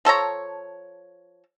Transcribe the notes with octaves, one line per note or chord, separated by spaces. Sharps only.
F3 A4 C#5 A#5